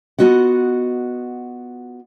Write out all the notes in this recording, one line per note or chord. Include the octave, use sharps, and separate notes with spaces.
B3 F4 F#4 D#5 F#5